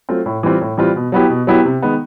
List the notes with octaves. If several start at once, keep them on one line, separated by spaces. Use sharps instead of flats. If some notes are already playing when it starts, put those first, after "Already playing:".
F#3 A3 C4 F4
A2
E3 G3 C4 F4
A2
E3 G3 C4 F4
B2
F#3 B3 E4 G4
B2
F#3 B3 E4 G4
C3
D#3 G#3 B3